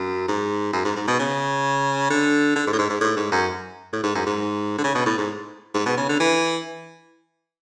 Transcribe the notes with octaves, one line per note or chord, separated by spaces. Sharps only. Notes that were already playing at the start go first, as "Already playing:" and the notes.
Already playing: F#2
G#2
F#2
G#2
G#2
B2
C#3
D3
D3
G#2
A2
G#2
G#2
A2
G#2
F#2
A2
G#2
F#2
G#2
D3
C#3
B2
A2
G#2
G#2
B2
C#3
D3
E3